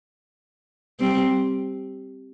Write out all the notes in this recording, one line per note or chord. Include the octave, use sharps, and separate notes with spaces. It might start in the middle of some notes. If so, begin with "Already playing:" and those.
G3 C4